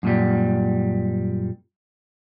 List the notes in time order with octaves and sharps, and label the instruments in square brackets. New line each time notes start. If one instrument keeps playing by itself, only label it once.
[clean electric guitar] F#2 A#2 G3